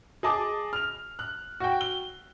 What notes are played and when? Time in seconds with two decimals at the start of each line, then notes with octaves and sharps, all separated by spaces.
0.23 G#4 D#5 A5 D6
0.73 F6 F7
1.19 F#6
1.60 F#4 G5
1.81 G7